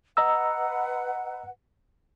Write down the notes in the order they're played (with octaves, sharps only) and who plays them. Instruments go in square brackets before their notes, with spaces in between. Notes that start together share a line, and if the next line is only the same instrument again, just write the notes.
[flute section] B4 F#5 [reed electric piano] D#5 A#5 E6